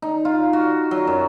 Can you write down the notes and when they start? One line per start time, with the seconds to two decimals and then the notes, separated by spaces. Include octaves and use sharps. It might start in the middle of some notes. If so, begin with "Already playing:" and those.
0.02 D#4
0.25 F4
0.53 F#4
0.91 F#3
1.07 F#2